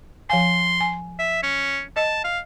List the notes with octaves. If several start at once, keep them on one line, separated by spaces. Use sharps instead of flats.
F3 F5 G#5 C6
G#5
E5
C#4
D#5 A5
F5